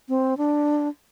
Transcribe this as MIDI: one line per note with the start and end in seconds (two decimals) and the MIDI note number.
0.09 0.37 60
0.38 0.88 62